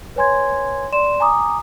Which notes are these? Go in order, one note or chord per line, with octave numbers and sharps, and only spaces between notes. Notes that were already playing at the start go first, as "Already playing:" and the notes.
B4 C#5 G#5 C6 G#6
D5 C6 E7
G#5 A#5 D6 D#6